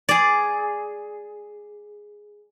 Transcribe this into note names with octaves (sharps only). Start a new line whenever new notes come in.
G#4 D5